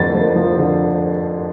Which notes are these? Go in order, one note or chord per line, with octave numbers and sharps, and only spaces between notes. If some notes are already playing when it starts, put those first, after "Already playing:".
Already playing: F2 D3 F3 A6
F2
F3
D3